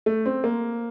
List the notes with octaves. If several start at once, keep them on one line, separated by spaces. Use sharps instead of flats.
A3
C4
A#3